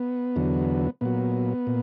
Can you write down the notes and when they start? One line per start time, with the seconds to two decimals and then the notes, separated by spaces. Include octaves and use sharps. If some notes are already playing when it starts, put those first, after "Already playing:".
Already playing: B3
0.36 E2 D3 F#3
1.01 A#2 F#3 B3
1.67 A#2